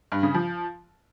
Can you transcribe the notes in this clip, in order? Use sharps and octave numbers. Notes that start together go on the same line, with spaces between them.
G2
C#3
F3